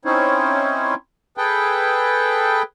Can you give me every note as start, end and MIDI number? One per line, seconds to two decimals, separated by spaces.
0.05 0.94 60
0.05 0.94 61
0.05 0.94 63
0.05 0.94 64
0.05 0.94 72
0.05 0.94 73
1.37 2.62 68
1.37 2.62 69
1.37 2.62 71
1.37 2.62 79